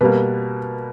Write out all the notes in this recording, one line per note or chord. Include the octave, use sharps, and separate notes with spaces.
B2 G3 A#3 B4